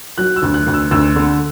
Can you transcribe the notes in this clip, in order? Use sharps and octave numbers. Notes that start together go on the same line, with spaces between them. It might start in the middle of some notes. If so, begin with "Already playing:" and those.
F#3 F#6
E6
D2
F#6
D2
E6
D2 E6
D3